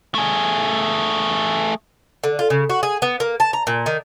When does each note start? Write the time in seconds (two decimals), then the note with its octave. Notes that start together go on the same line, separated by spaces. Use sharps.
0.15 A3 G#4
2.23 D3
2.39 F4
2.50 C#3
2.70 F#4
2.83 G#4
3.02 B3
3.20 A#3
3.40 A5
3.53 A#5
3.67 A#2
3.86 D#3